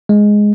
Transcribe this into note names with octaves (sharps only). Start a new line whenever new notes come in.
G#3